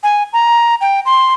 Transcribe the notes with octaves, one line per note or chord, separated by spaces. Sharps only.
G#5
A#5
G5
C6